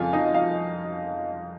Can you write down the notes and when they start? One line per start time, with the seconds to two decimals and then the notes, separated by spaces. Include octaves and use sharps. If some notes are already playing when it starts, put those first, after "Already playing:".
Already playing: F2 C#3 F3 C4 F4 F5 G#5
0.13 D#4 D#5
0.34 F4 F5